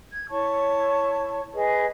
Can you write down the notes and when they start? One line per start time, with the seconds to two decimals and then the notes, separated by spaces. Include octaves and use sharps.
0.11 G#6
0.30 E4 C#5 A5 C#6
1.54 G#4 B4 D#5